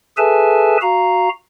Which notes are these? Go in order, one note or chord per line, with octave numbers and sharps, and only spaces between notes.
G#4 A4 B4 E5 G#5 A5
F#4 F5 A#5